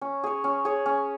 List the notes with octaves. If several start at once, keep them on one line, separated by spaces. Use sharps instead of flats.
C#4
G#4 C#5
C#4
G#4 C#5
C#4